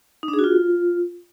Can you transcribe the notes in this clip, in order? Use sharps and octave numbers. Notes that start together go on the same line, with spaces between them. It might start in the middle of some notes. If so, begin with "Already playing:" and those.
D#4
D4
G#4
F#4
F4